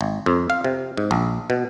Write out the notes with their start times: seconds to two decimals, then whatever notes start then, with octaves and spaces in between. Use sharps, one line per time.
0.01 G#1
0.26 F2
0.50 F5
0.64 C3
0.97 G#2
1.11 A#1
1.50 B2